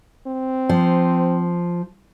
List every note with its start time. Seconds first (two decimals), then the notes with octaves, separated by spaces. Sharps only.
0.27 C4
0.69 F3